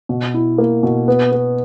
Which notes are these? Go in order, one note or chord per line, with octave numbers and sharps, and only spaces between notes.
B2
E4
A#3
B2
B3
B3